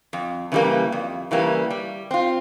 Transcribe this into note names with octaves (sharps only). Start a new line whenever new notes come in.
F2
C#3 E3 G3 A#3
F2
C#3 E3 G3 A#3
G3
C4 F4